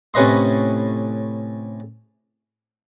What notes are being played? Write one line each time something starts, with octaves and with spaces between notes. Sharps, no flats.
A2 C3 C#4 B4 D#5 C6